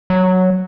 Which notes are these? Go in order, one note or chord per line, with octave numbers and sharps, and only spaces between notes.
F#3